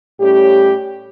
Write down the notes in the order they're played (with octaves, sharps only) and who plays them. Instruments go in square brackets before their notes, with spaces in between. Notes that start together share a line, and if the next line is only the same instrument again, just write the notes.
[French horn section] A2 G3 C#4 G4